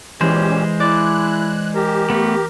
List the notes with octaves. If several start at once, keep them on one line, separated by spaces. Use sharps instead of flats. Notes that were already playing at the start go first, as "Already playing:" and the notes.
A#2 E3 G#3 C#4 G4 C5
E4 D5 F#6
G4 A#4
A3 B3